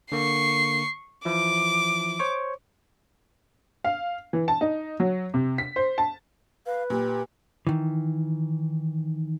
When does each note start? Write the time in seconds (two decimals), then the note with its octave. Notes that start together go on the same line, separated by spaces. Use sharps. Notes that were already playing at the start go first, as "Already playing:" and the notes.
0.12 D3 A#3 C#6 C7
1.25 E3 F3 E4 D6
2.19 C5 C#5 C#6
3.84 F5
4.33 E3
4.48 A5
4.61 D#4
5.00 F#3
5.34 C3
5.58 B6
5.76 C5
5.98 A5
6.66 B4 F5
6.90 A#2 G4
7.67 D#3 E3